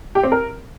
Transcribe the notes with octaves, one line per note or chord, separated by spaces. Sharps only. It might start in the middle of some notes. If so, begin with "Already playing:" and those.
G4
C4
A#4